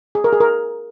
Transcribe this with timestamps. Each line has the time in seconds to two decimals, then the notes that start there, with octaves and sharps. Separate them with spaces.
0.15 G#4
0.24 A#4
0.33 G#4
0.40 A#4